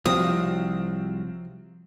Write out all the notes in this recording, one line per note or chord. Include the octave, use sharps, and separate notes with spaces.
C2 F3 F#3 C4 F4 D#6